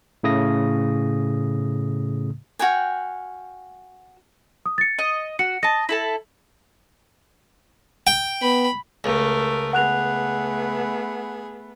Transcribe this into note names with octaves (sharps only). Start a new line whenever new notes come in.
A2 C#3 A3 D#6 A#6
F#4 F5 G5 G#5
D#6
A6 C#7
D#5
F#4 C#7
D#5 A5 A#6
E4 A4 A5
G5
B3 B5
C#2 A3 A#4
A3 B3 G#4 F#5 F#6 F7